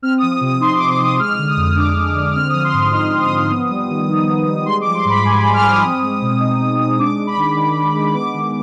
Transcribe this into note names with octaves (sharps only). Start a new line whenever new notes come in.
C4 F6
D#6
F3
D#6
C3
D#6
D#4 C6
D6
C4
D6
F3 D#6
G#3 F6
F6
D3
D#6
F2
D#6
D4 D6
G#3
D3
C4 F6
F3 D#6
C6
G#2
D#4 F6
C4
D#6
F3
B3
G3
D#3
D#4
B3
G3
G#3 C6
D6
F3
C6
G#2 B5
G#2 G#5
B5
G#3
F6
F3
D#6
C4
G#3
B2
D#4
C4
G#3
D4 D6
G#3
B5
D#3
D#3
D4
G#3
B3 D6
D#3